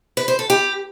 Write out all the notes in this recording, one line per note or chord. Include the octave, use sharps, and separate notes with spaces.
B4
C5
A4
G4